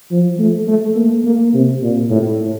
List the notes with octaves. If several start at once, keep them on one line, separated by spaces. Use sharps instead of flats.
F3
A3
A3
A#3
A#3
C3
A#2
A2